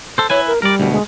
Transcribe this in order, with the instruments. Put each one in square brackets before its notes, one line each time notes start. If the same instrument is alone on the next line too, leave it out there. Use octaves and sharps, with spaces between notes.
[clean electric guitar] A4 C5
[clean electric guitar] E4 B4 G#5 [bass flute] C#5
[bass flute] A#4
[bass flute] G3 [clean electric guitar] A#4 D5
[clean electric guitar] D2 B2
[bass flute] G#3